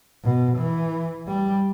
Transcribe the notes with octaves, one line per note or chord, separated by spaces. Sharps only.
B2
E3
G3